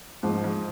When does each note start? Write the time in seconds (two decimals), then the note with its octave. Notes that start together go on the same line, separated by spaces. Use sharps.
0.23 G#2 F3
0.44 G#2